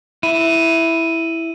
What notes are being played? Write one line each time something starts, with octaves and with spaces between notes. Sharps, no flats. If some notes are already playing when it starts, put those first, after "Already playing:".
E4 D#7